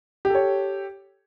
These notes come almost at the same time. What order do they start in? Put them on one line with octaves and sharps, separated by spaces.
G4 A4 C#5